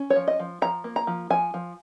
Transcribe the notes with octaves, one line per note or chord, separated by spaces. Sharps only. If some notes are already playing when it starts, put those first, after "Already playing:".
Already playing: C#4
C#5
F3
D#5
F3
F3 A#5
A#3
A#5
F3
F3 G#5
F3